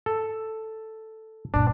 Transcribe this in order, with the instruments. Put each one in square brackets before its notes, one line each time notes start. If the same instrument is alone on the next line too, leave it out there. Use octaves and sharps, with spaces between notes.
[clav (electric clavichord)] A4
[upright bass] G2 A#2 [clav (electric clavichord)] D4